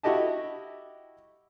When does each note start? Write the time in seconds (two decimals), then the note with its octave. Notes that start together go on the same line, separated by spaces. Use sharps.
0.03 E4 F#4 G4 D#5 A5